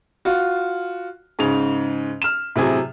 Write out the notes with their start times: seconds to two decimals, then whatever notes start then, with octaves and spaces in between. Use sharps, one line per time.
0.25 F4 F#4
1.39 G#2 C#3 F7
2.22 F6 E7
2.56 A2 C3 F#3 G#4